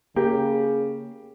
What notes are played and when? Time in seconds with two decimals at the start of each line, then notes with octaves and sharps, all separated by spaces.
0.16 C#3 A#3 G4